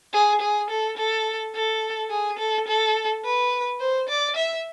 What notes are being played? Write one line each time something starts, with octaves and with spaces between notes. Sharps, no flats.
G#4
G#4
A4
A4
A4
G#4
A4
A4
B4
C5
D5
E5